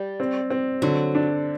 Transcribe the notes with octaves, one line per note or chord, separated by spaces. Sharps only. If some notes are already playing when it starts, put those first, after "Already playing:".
Already playing: G3
C4
C4
D3 F#3
D4